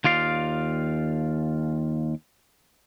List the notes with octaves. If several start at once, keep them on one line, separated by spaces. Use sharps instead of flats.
D#2 F4 D5 F5